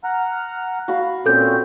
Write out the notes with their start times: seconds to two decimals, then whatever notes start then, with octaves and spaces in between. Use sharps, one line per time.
0.04 F#5 A#5 F6
0.88 F#4 F5 B5
1.26 A#2 C4 C#4 A4 G6